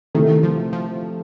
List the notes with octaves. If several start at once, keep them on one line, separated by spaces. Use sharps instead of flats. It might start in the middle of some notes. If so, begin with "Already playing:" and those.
C3 D#3 E3 A3
F3
F3